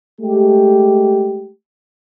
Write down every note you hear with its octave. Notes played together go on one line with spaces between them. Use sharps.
G#3 A3 G4